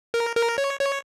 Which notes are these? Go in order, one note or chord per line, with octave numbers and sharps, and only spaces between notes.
A#4
A#4
C#5
C#5